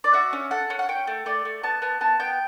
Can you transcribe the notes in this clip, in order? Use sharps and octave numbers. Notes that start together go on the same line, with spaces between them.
D5
F#4 E5
C#4
A4 F#5
C#4
F#5
C#4 G5
A3
A3 D5
A3
B3 A5
B3 A5
B3 A5
B3 G5